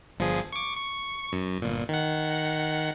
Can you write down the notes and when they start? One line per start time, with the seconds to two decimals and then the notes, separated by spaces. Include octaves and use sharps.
0.19 G1 F3 G#4
0.53 C#6 D6
0.76 C#6
1.33 F#2
1.62 G1 A#2
1.89 D#3 F#5